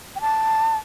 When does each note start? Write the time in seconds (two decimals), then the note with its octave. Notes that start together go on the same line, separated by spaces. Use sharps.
0.16 G5
0.21 A5